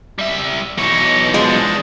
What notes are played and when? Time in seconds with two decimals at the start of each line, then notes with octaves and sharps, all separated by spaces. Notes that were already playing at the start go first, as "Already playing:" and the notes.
0.19 G3 E5
0.78 B2 E3 D#4 C#5
1.34 E3 F3 G#3 D4